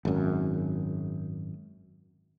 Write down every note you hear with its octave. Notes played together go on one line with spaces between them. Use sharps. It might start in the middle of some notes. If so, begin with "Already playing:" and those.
G#1 F#2